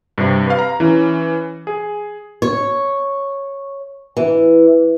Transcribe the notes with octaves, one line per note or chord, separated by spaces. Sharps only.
G2 C3
B4 F5
A#5
E3 C#4
G#4
C#5
E3